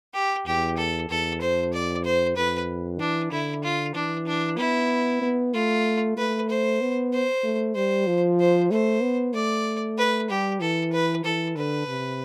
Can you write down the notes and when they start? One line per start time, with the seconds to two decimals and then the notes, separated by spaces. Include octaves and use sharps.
0.14 G4
0.46 E2 G4
0.77 A4
1.09 E2 A4
1.41 F2 C5
1.73 D5
2.04 C5
2.36 F2 B4
3.00 E3 D4
3.32 D3 E4
3.64 F4
3.95 E3 D4
4.27 D4
4.58 B3 E4
5.22 B3
5.54 A3 F4
6.17 A3 B4
6.49 C5
6.81 B3
7.13 C5
7.44 A3
7.75 G3 C5
8.07 F3
8.40 C5
8.71 A3 C5
9.02 B3
9.34 A3 D5
9.98 B4
10.30 G3 G4
10.60 E3 A4
10.93 B4
11.24 E3 A4
11.56 D3 B4
11.87 C3